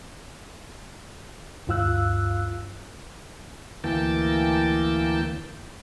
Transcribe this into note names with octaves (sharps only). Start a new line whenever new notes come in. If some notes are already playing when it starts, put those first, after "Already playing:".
D2 G2 F4 F5 E6 F#6
D2 E3 A#3 G5 A5